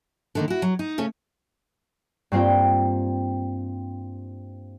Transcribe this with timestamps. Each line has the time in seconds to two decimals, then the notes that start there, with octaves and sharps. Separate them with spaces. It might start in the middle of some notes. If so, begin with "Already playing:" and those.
0.35 D3 D#3 A#3
0.48 E4 F#4
0.62 F#3
0.79 D#4
0.98 C#3 A3 C#4
2.32 G2 A#3 C4 F4 G5